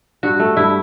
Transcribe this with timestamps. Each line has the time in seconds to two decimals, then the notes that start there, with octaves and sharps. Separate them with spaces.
0.23 G2 F#4
0.39 A3
0.57 G2 E4